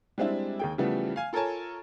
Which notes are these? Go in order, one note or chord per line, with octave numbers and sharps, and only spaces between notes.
G3 G#3 C4 D4 E4
D#2 G#4 G5
C#3 E3 F3 G3 A3 B3
F5 G#5
F4 A4 A#4 C#5 G#5 A5